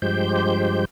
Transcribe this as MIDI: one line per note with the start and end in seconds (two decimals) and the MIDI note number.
0.02 0.85 43
0.02 0.85 53
0.02 0.85 56
0.02 0.85 67
0.02 0.85 72
0.02 0.85 91